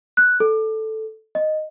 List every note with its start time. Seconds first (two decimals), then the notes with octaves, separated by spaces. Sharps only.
0.17 F#6
0.40 A4
1.35 D#5